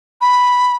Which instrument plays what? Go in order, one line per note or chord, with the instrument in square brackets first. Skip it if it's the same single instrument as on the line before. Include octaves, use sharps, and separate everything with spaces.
[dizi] B5